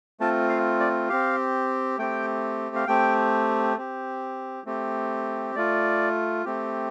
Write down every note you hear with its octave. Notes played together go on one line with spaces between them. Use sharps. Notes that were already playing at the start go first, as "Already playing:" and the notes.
A3 C4 F4 A5
F5
D5
C4 G4 F5
A3 C4 G4 G5
F5
A3 C4 G4 G5
C4 G4
A3 C4 G4
A3 F4 D5
A3 C4 G4